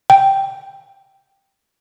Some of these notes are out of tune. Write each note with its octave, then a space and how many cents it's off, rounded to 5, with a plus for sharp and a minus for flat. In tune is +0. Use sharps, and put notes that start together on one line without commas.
G5 -5